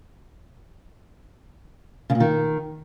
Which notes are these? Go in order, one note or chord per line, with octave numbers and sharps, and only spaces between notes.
C#3
A#2
D#3